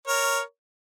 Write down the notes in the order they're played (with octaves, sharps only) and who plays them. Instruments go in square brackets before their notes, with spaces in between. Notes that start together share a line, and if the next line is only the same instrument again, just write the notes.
[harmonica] A#4 C#5